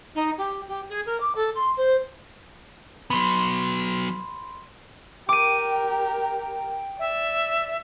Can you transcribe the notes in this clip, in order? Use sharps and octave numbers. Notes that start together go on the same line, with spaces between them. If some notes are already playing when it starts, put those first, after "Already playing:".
D#4
G4
G4
G#4
A#4
D6
A4
C6
C5
F#3 B3 B5 C6
G4 A#4 G5 D6 D#7
D5 E5